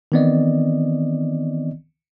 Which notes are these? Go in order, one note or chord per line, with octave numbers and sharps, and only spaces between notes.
D#3 E3 B3 C4 D5 D#5